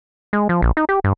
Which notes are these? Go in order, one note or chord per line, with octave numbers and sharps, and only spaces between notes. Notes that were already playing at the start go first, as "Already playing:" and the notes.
G#3
F3
A#1
D#4
G4
G2